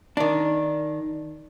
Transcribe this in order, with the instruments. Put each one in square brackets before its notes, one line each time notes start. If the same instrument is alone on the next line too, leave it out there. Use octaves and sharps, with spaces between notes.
[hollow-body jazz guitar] D#3 D4